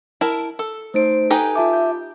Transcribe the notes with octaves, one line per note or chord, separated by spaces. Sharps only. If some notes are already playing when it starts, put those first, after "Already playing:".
E4 A#4 A5
A4
A3 D#4 C5 D7
D#4 G4 A4 B4 G#5 G6
F4 E5 A5 D6
G6